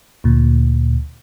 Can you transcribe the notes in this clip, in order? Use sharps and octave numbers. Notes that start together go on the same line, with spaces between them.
D2 A#2